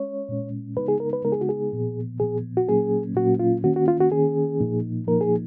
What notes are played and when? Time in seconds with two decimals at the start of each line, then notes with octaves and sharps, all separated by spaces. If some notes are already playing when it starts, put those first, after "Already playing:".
Already playing: G#3 C#4 C#5
0.29 A#2 G#3 C#4
0.77 C#3 G#3 B3 D#4 B4
0.88 G#4
1.00 A#4
1.13 B4
1.24 C#3 G#3 B3 D#4 A#4
1.32 G#4
1.41 F#4
1.49 G#4
1.72 A#2 F3 B3
2.20 A#2 F3 B3 G#4
2.57 F#4
2.68 A#2 F#3 A#3 C#4 G#4
3.16 A#2 F#3 A#3 C#4 F#4
3.40 F4
3.64 D#3 A#3 C#4 F#4
3.76 F#4
3.88 F4
4.00 F#4
4.11 D#3 A#3 C#4 G#4
4.60 A#2 F3 A#3 D#4
5.07 A#2 F3 A#3 D#4 A#4
5.21 G#4